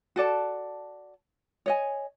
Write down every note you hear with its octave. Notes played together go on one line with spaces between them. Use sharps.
F#4 A4 D5 A5
C#5 D#5 G#5